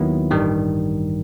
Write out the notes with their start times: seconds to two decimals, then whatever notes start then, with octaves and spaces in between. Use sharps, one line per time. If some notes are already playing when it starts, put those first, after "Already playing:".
Already playing: D#2 D#3 F#3 B3 E4
0.31 A1 G2 D#3 G3